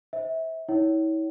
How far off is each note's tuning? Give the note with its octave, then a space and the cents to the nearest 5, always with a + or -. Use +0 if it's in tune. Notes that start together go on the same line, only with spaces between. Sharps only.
C5 +0 E5 -25
E4 -40 C#5 +15 G5 -45